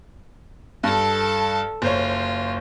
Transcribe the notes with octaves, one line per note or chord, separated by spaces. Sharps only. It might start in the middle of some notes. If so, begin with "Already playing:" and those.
G2 A4 A5
F#1 F4 C5 C#5